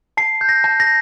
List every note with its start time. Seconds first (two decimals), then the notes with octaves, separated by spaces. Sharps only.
0.17 A5 C7
0.41 G6
0.49 A#6
0.64 A5
0.80 A#6